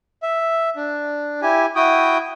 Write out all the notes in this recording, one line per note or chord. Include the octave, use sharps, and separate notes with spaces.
E5
D4
E4 G4 G#5
E4 F#4 G5 D#6